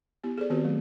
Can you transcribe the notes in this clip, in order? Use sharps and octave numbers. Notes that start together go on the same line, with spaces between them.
B3 E4 G4
G#4 A4 C5 D5
D#3 B3 C4 F#4 G4 B4
D#3 F#3 A3